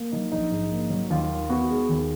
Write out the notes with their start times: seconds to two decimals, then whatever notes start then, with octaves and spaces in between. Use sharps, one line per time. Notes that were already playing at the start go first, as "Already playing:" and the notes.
Already playing: A#3
0.12 F#3 D#4
0.32 A#1 D#4
0.51 G#2
0.71 A#3
0.90 F#3
1.10 D#2 F4
1.29 D#3
1.50 B3 F#4
1.69 G#3
1.89 D#2